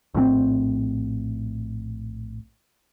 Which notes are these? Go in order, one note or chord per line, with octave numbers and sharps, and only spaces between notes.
A#1 A2 D#3 C4